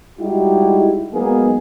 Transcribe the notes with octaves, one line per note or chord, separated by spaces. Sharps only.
G3 G#3 D#4 E4 F#4 G4
F#3 G#3 A#3 B3 D#4 G#4